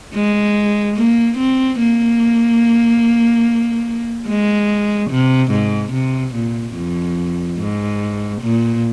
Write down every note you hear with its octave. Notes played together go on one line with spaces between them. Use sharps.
G#3
A#3
C4
A#3
G#3
C3
G#2
C3
A#2
F2
G#2
A#2